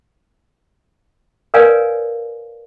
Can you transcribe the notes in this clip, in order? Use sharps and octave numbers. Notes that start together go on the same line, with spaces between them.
A#4 B4 C#5 D5 F5 G#5